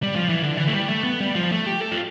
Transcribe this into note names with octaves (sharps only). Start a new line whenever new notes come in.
G3
F3
E3
D3
E3
A3
G3
A3
B3
G3
F3
A3
G4
A4
F4